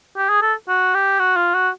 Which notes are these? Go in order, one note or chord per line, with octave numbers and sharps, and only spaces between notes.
G4
G#4
A4
F#4
G4
F#4
F4
F#4